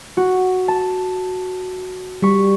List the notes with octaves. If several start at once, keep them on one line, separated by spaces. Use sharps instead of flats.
F#4
A5
G3 C#6 B6